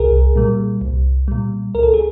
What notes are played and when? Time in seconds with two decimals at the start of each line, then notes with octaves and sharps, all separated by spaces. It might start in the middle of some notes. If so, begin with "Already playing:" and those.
Already playing: C2 G#4 A#4
0.36 A#2 G3
0.81 C2
1.28 A#2 G3
1.74 C#2 A#4
1.83 A4
1.94 G#4